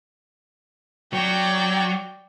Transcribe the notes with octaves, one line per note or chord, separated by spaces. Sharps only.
F#3 D5 G5